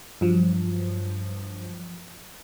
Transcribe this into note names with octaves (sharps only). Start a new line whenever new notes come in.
G2 F3 F#3